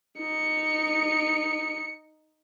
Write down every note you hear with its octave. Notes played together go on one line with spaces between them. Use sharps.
D#4 C#7